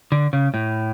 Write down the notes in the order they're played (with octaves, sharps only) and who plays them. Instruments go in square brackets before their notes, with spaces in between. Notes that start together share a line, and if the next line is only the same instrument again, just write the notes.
[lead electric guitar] D3
C#3
A2